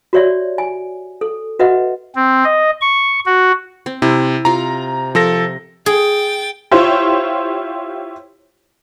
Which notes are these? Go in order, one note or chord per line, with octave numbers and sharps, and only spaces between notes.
F#4 G4 C#5 D5 E5
G#5
A4
F#4 B4 D#5 E5 F#5
C4
D#5
C#6
F#4
C4
C3 E4
C3 F4 A#5
F3 A4 A#4 A#6
G#4 G5 A6
E4 F4 G4 C5 C#5